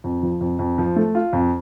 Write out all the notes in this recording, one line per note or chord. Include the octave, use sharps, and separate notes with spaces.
F2
F3
F2
F2
F3
A3
F4
F2